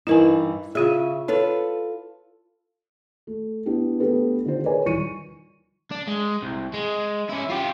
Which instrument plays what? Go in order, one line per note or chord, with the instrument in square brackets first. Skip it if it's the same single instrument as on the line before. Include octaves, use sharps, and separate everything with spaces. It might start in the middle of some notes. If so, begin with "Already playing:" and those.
[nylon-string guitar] G2 E3 D#4 [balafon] E4 A#4 G#5
[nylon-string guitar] C#3 E5 [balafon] F4 G#4
[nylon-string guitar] F4 A4 B4 [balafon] C#5
[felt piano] A3
B3 D4 E4 G4
A3 B3 D4 G4 A4 B4
D3 D#3 F4 G4 C5
G#4 A#4 B4 C#5 D5 G#5
D#1 D#3 E3 C#6 C#7 D#7
[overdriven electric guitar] D4
G#3
C2
G#3
C#4 E4
F4 G4